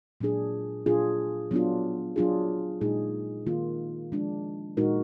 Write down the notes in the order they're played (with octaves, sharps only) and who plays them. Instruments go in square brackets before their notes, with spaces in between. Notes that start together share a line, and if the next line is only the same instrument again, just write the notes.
[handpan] A#2 F#3 D4 G#4
A#2 F#3 D4 F4 G#4
F#3 B3 D4 F4
F#3 D4 F4 G#4
A#2 G#3 D#4 G#4
D#3 A#3 F4
F3 G#3 D4
A#2 G#3 D#4 F#4 A#4